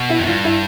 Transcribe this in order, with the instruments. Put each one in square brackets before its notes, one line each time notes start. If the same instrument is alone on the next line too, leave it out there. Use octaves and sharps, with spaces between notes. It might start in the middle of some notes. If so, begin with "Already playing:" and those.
Already playing: [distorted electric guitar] B2
[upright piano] E4
[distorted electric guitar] F2
[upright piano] E4
[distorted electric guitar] G2 [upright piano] F4
[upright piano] E4